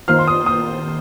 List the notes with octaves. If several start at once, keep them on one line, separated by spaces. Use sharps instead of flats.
D#3 A#3 F4 C5 F6
C6
D#6
D#6